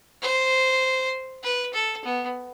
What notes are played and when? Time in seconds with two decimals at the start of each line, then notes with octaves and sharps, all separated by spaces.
0.22 C5
1.44 B4
1.74 A4
2.05 B3